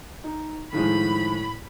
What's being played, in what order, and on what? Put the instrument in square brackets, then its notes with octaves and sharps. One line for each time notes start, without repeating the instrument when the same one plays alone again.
[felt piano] D#4
[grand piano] A2 [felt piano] D#3 F3 G#3 [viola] B5